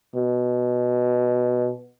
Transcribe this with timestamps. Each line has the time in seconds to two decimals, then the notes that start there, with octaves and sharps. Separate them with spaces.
0.15 B2